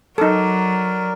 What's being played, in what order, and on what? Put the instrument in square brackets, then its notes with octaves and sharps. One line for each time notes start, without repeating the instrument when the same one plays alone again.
[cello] F#3 [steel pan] D#4 A4 [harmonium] A#4 D5